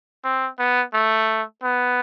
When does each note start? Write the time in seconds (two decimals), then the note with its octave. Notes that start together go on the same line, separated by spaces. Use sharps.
0.24 C4
0.59 B3
0.93 A3
1.63 B3